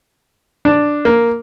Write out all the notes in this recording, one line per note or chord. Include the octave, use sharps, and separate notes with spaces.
D4
A#3